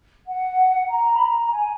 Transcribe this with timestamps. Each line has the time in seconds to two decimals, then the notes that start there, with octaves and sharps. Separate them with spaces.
0.26 F#5
0.88 A#5
1.16 B5
1.19 A#5
1.50 G#5